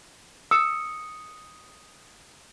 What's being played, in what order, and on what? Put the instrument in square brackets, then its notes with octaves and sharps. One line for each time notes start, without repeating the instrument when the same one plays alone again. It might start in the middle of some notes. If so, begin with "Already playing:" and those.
[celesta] D#6 C#7 [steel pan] E6